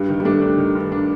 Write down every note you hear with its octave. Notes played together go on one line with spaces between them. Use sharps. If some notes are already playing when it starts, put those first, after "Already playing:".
Already playing: G2 G3
D#3
G3
A3 D4
D4
D#3
G2
D4